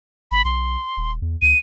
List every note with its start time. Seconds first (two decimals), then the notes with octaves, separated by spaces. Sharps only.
0.31 G#1 B5
0.45 B1 C6
0.97 D#1
1.22 E2
1.42 D2 D#7